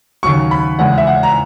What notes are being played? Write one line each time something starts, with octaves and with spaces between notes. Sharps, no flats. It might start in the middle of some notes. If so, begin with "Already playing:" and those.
D#2 C#3 F#3 C#6
B5
E2 C#3 G#3 F#5
E5
F#5
A#5